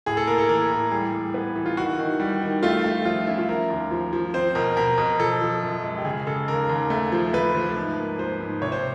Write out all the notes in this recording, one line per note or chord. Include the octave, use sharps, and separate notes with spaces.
A2 G#4
A4
A#3 A#4
A4
E3 A#4
A2
G3 G#4
G3
B3
E3
F4
D#3 F#4
D#3
G3
D#3
A3 F4
A3
F3 F4
C#4 E4
F4
F3 A#4
D#2
F3
F3
C4 C5
B2 A#4
B2 A#4
B2
F3 A4
F3
F#2
G#3
G4
C#3 G#4
C#3 A4
D#2 A#4
D#2
A3
F3
A3 B4
F3
G#2
A#3
F3 C5
G#2
C3 C#5
C5